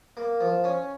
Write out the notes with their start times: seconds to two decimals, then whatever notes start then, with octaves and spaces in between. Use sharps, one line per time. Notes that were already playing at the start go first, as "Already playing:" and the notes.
0.17 A#3
0.40 F3
0.64 C#4